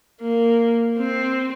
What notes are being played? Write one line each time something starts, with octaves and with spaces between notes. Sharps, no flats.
A#3
C4